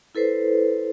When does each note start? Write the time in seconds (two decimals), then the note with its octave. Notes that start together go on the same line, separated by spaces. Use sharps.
0.15 E4 A4 B4 C5